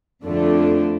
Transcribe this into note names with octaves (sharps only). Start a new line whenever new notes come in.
F2 D3 A3 D4